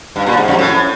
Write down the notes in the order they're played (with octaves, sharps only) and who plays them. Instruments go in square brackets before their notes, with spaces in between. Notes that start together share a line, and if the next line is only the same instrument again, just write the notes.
[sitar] G2
A#2
G#2
F2
A2